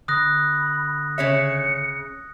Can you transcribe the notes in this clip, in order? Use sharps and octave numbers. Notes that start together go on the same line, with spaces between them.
D3 B5 D#6 F#6 A#6
C#3 C#5 E5 C#7